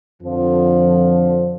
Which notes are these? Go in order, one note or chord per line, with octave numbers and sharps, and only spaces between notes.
F2 D3 F3